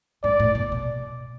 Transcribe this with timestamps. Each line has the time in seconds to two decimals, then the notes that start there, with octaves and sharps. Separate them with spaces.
0.24 G#2 D5
0.40 A2
0.55 B2
0.72 B2